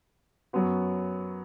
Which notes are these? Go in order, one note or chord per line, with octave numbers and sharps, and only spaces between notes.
F#2 F#3 B3 F#4